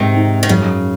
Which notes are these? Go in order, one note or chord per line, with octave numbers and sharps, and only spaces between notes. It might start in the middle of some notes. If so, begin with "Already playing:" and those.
Already playing: G#2 C3 D#3
D#4
D#3
F#2 C#3